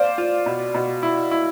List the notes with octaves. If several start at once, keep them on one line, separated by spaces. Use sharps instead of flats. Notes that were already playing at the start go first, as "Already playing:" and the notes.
Already playing: C5 D5 F5
F4
B2
B2
E4
E4